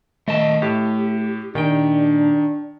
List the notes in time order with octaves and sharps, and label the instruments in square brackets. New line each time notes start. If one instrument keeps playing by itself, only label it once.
[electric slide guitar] D#3 D#5 E5 [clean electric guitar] A3 A5
[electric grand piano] A2 [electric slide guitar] G4
[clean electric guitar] A#2 G5 [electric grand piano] D#3 [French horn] D4